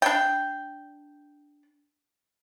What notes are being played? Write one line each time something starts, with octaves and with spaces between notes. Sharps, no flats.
D4 G5